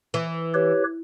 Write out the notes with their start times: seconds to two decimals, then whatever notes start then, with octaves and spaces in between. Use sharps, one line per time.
0.14 E3
0.54 G4 B4 C#5